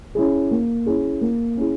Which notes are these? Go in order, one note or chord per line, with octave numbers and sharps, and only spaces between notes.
C#4 E4 G#4
A#3
C#4 E4 G#4
A#3
C#4 E4 G#4